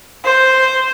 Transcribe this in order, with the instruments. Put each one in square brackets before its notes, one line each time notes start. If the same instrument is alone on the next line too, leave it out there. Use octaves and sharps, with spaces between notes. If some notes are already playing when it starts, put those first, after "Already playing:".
[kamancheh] C5